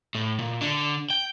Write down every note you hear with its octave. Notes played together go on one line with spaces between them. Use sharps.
A2
A#2
D3 D4
G5